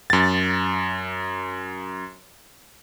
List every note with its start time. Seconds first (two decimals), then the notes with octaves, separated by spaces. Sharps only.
0.10 F#2 A6